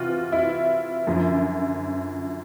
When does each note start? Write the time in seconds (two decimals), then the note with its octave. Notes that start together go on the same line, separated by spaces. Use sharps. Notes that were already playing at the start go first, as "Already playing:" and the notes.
Already playing: C3 E3 F4 F#4
0.32 E4
1.07 F#2 D3 F3